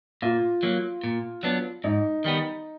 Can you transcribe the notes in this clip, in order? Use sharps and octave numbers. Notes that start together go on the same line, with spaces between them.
A#2 F4
F#3 A#3
A#2
F#3 B3 D4
G#2 D#4
D#3 G3 B3